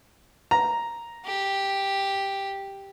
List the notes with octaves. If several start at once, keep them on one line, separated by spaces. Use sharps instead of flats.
A#5
G4